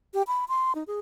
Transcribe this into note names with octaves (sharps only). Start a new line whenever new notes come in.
G4
B5
C6
D#4
G#4